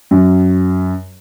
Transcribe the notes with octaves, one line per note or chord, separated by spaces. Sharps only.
F#2